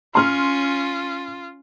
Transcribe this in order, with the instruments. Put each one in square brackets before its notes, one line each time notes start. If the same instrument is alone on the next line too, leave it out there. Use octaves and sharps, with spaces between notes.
[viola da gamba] C#4 [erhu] F4 [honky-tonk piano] C6 F6